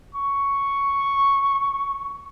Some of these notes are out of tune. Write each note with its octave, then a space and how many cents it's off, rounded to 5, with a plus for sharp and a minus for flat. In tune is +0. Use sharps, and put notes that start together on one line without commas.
C#6 +5